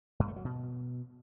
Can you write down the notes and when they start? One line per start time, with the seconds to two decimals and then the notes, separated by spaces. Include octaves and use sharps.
0.20 G2
0.28 A3
0.36 F#3
0.45 B2